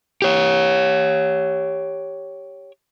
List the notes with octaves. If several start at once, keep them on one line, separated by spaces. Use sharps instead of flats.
G4 C#5